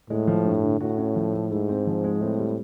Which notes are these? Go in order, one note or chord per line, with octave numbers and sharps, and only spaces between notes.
A2 G#3
F3
G2
D3
A2 F#4
C#4
F3
A3
G#2 E4
C4
F3
G#3
A2 C4
G3